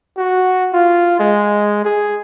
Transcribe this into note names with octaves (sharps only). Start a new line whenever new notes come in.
F#4
F4
G#3
G#4